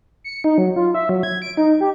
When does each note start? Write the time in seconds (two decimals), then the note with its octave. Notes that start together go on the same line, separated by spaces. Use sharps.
0.24 C#7
0.44 D#4
0.58 F#3
0.76 F4
0.94 E5
1.09 F#3
1.23 G#6
1.42 D7
1.57 D#4
1.81 G4